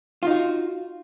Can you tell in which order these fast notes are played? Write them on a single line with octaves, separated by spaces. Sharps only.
F4 D#4 F#4